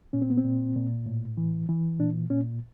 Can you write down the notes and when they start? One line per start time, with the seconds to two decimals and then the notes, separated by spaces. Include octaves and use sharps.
0.13 A#2 C#4
0.22 C4
0.30 B3
0.37 C4
0.45 A#2
0.76 A#2
1.06 A2
1.37 E3
1.69 E3
1.99 A#2 D4
2.30 A#2 C#4